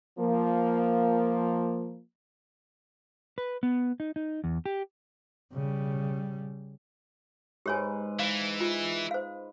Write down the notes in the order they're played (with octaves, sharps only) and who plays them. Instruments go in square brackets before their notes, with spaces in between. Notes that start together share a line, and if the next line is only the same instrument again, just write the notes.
[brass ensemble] F3 A#3
[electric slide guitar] B4
B3
D#4
D#4
E2
G4
[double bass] C#3 G3
[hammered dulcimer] G#2 B4 [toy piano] G4 C#5 G#5
[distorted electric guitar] E3 [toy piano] F5
[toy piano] F4
C5 F5